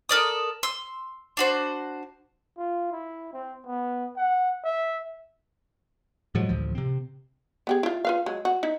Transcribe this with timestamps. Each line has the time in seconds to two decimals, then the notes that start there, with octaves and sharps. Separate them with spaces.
0.09 A4 A#4 D5 D#6
0.63 C6 E6
1.37 D4 F#4 C5
2.57 F4
2.92 E4
3.33 C4
3.66 B3
4.17 F#5
4.65 E5
6.35 A2 F3 F#3 G#3
6.49 A1 D2 F3
6.75 C3 C4
7.67 B3 G4 G#4
7.83 E4 F4
8.05 F4 B4 F5
8.26 F#3 G#3
8.45 F#4
8.63 D#4 E4